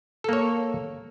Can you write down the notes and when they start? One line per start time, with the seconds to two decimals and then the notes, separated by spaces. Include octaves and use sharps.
0.24 A4
0.29 A#3
0.33 C#5